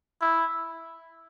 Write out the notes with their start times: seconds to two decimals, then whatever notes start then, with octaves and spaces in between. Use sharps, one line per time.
0.21 E4